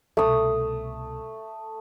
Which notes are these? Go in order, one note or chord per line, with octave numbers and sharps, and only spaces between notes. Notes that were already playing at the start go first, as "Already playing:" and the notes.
C2 B2 A3 D#6